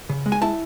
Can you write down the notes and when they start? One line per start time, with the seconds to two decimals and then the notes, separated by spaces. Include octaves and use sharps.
0.09 C#3
0.26 G#3
0.32 G#5
0.42 E4 A5